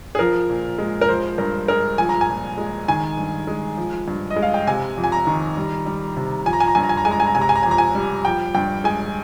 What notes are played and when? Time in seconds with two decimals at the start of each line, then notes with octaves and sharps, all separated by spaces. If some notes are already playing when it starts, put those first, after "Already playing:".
0.15 G#4
0.19 F3 A#4
0.50 A#2
0.78 G#3
1.01 A#4
1.09 F3 C5
1.38 G2 A#4
1.68 G#3 A#4
1.98 F3 G#5
2.09 A#5
2.21 G#5
2.29 A#2
2.58 G#3
2.88 D#3 G#5
3.18 G2
3.47 G#3
3.77 F3
4.08 G2
4.30 D#5
4.36 G#3
4.42 F5
4.54 G5
4.67 C3 G#5
4.97 F2
5.04 G#5
5.12 A#5
5.27 D#3
5.57 G3
5.86 G3
6.17 C3
6.46 F3 G#5
6.53 A#5
6.60 G#5
6.68 A#5
6.75 G2 G#5
6.83 A#5
6.89 G#5
6.97 A#5
7.05 G#3 G#5
7.12 A#5
7.20 G#5
7.27 A#5
7.35 C3 G#5
7.41 A#5
7.49 G#5
7.56 A#5
7.63 G#5
7.66 F2
7.71 A#5
7.78 G#5
7.95 G3
8.25 F3 G5
8.55 G2 G5
8.84 G#3 G#5